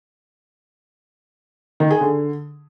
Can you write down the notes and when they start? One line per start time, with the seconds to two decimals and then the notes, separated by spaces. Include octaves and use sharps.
1.80 D#3
1.90 G#4
2.01 D3